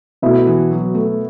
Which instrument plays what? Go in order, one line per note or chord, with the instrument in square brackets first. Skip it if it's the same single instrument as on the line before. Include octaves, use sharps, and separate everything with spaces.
[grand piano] B2 B3 E4 [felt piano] A3
[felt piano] E3
F#3
A3